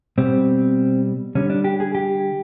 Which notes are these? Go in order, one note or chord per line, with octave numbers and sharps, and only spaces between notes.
B2 G3 C4
D3 G3 C#4
D4
G4
G#4
G4